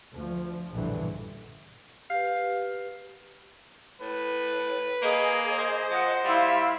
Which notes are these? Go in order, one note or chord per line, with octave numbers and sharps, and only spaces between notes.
D2 F3
A#1 E2 G2 B2 D3 E3
G4 B4 F5
A2 B4
A#3 G#4 D#5
C5
F3 D#5 F#5
G3 E4 F5 C6